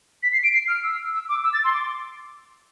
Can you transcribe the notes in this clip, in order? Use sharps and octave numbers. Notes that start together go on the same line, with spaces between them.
B6
C7
D7
C7
F6
E6
E6
D6
E6
A6
C6
D6